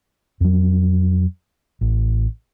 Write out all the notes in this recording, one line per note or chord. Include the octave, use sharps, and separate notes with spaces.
F2 F#3
A1